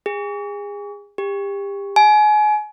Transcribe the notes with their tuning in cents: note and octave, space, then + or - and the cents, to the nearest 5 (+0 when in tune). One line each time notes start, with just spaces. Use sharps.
G#4 -30
G4 +30
G#5 +30